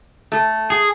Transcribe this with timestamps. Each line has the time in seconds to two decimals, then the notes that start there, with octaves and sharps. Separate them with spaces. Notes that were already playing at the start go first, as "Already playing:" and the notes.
0.32 A3
0.70 G#4